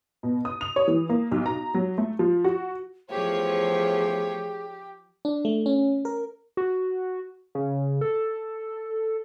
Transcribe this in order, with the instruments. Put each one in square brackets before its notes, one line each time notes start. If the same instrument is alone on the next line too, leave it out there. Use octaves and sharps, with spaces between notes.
[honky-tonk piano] B2
D#6
F7
C#5
E3
A#3
B1
A#5
F#3
A3
F3
F#4
[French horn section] E2 A3 C5 [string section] F3 C#5 [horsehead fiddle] G4 [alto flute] G#4
[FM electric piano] D4
A3
C#4
A#4
[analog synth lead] F#4
C#3
A4